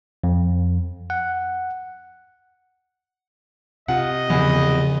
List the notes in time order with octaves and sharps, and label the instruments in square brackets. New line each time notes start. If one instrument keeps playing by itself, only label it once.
[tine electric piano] F2
F#5
[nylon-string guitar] C3 F4 [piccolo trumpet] D#5 [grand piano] F#5
[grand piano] E2 [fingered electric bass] C#3 F3